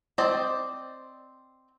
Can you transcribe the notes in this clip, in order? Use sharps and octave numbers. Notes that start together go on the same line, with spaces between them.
C4 C5 D5 D#5 G5